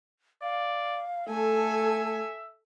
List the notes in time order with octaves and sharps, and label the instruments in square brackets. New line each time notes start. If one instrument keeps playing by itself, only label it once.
[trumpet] D5 [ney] F5
[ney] A3 [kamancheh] A4 G#5 [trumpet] E5